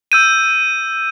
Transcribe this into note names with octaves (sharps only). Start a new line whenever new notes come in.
E6 G6 D#7